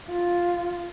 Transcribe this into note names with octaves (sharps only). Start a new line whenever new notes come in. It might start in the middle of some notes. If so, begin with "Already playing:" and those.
F4